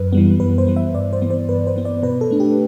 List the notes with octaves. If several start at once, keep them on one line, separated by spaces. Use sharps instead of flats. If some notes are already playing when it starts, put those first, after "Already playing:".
Already playing: F#2 B4
E3 G3 B3
F#2 B4
C5
E3 G3 B3
E5
G2 D5
C5
E3 B3
C5
G2 B4
C5
E3 B3
D5
B2 B4
A4
A3 D4
G4